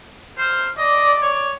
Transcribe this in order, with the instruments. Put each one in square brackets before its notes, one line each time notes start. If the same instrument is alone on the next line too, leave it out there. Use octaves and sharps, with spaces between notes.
[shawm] C5 [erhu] F6
[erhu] D5 [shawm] D#5
[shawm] C#5